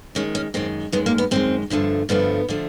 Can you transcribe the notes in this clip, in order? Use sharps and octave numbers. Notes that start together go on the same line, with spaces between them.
F#2 D#3 G#3 C#4
C#4
F#2 D#3 G#3 C4
F#2 D#3 G#3 B3
A#3
B3
F#2 D#3 G#3 C4
G2 D3 F3 A3
G2 D3 F3 A3 B3
D3 F3 A3